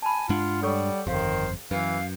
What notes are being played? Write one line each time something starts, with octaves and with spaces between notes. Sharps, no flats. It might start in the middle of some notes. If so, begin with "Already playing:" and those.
G#5 A5 B5
G2 G#3 D4 F4 F#5
G3 A4 C#5 C#6
G1 F2 D#3 G4 C5 F5
F#2 E3 B4 F5